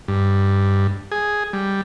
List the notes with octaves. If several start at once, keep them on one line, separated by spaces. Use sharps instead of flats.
G2
G#4
G3